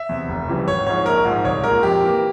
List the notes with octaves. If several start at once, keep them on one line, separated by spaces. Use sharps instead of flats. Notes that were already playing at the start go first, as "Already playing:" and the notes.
Already playing: E5
E2 C3
F1
F2 C#3 E3 G3
G#1 C#5
G#2 F3 G#3 C#5
A#1 A#4
G#2 F3 G#3
C2 C#5
A#2 G#3 A#4
F2 G4
E3 A#3